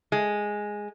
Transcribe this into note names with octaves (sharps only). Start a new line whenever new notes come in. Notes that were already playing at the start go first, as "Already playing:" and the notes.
G#3